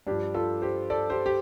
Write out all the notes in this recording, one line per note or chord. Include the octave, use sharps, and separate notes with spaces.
G2 F3 D4 G4
F4 A4
G4 C5
A4 D5
G4 C5
G4